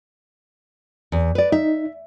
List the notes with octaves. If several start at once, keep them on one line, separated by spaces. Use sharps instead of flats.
E2
B4 D5
D#4 E5